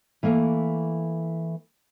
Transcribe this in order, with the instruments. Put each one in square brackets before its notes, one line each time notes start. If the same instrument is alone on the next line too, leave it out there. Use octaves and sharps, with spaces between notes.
[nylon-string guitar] E3 A3 A#3 E4